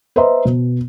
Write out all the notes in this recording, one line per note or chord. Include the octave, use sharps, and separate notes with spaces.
B4 C5 D#5 E5 A#5 C6
B2